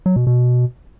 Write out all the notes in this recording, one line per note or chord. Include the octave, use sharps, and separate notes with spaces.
F#3
B2
B2